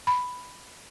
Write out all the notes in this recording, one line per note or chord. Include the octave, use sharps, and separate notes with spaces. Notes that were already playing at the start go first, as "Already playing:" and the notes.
B5